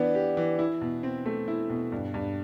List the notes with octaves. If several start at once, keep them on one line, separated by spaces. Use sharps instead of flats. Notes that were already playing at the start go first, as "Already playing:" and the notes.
Already playing: E3 B3 D4
G4
E3
E4
B2
C4
A3
E4
B2
G2
G2